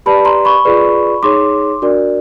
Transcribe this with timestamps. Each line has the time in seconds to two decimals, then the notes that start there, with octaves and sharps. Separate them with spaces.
0.06 G4 B4 D5 A5 B5
0.25 A#5 C6
0.45 B5 C#6
0.65 F4 G#4 B4 D5
1.23 D#4 G#4 C#5 C6 D6
1.82 D4 F#4 A#4 D5